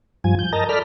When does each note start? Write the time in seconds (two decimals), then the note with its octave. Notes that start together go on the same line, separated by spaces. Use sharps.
0.24 G2 F3 G#5
0.39 G6
0.53 A#4 D#5 A5 A#5
0.69 A4 D5 B5 F6